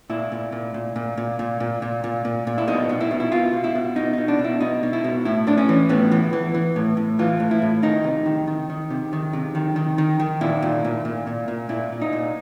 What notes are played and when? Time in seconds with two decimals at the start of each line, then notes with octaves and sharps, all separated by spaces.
0.10 A#2 E4
0.32 A#2
0.52 A#2
0.74 A#2
0.96 A#2
1.17 A#2
1.39 A#2
1.60 A#2
1.82 A#2
2.04 A#2
2.25 A#2
2.47 A#2
2.58 E4
2.68 B2 D#4
2.89 B2
3.01 E4
3.11 B2
3.20 E4
3.32 B2 F4
3.53 B2
3.64 E4
3.75 B2
3.96 B2 D#4
4.13 B2 D#4
4.28 D4
4.39 B2
4.44 E4
4.61 B2 D#4
4.83 B2
4.93 E4
5.04 B2
5.25 A2 E4
5.47 A2 D4
5.58 C#4
5.69 E3
5.89 A2 B3
6.12 E3
6.33 E3
6.54 E3
6.76 A2
6.97 A2
7.19 E3 F4
7.40 A2
7.51 E4
7.62 A2
7.82 D#3 D#4
8.04 C3
8.26 D#3
8.48 D#3
8.70 D#3
8.90 C3
9.13 D#3
9.33 C3
9.55 D#3
9.76 D#3
9.98 D#3
10.20 D#3
10.41 A#2 E4
10.62 A#2
10.85 A#2
11.05 A#2
11.27 A#2
11.48 A#2
11.69 A#2 E4
11.92 A#2
12.01 D#4
12.13 A#2